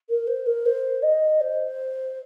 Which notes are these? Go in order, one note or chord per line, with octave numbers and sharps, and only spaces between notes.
A#4
C5
A#4
C5
D#5
C5